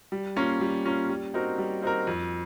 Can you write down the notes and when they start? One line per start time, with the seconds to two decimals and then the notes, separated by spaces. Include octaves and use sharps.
0.12 G3
0.36 A#3 C#4 F4
0.61 G3
0.85 A#3 C#4 F4
1.09 G3
1.34 C4 D#4 F#4 A#4
1.58 G3
1.82 C4 D#4 F#4 A#4
2.07 F2